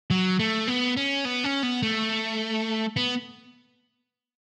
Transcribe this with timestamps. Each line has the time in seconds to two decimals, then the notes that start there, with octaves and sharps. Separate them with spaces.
0.10 F#3
0.39 A3
0.68 B3
0.97 C#4
1.25 B3
1.44 C#4
1.63 B3
1.82 A3
2.96 B3